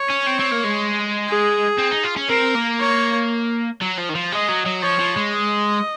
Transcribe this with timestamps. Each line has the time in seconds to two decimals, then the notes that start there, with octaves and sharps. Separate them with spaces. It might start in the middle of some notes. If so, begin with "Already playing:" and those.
Already playing: C#5
0.10 C#4
0.26 C4
0.39 C4
0.51 A#3
0.64 G#3
1.28 G#4
1.79 C4
1.91 D#4
2.04 F4
2.17 C#4
2.29 C4 A#4
2.55 A#3
2.80 C#5
3.82 F#3
3.98 F3
4.09 D#3
4.15 F3
4.32 G#3 D#5
4.48 F#3
4.66 F#3
4.82 F3 C#5
4.99 F3
5.17 G#3
5.33 D#5